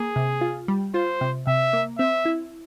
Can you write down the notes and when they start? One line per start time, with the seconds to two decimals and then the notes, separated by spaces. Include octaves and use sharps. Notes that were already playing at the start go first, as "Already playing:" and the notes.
Already playing: A#3 G#4
0.16 C3
0.41 F4
0.68 G3
0.94 F4 C5
1.21 C3
1.47 C3 E5
1.73 A#3
1.99 C4 E5
2.25 E4